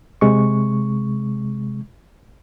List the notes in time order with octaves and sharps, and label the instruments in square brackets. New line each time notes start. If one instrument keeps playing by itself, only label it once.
[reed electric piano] C3 G#3 C#6